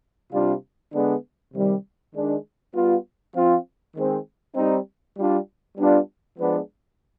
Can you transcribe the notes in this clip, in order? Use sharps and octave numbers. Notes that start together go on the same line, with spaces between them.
C3 G3 D4 F4
D3 G#3 B3 D4
C3 D#3 G3
D#3 G#3 D4
G3 B3 F4
F3 C4 F4
D#3 G#3 C4
G3 C4 D#4
G3 D4 F4
G3 B3 D4 F4
F3 G#3 B3 D4